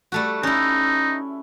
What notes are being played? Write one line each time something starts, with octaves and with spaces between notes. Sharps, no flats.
G3 A3 F#4
C#4 D#4 E4